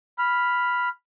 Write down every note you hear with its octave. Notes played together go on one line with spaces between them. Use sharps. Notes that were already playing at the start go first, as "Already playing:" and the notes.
B5 F6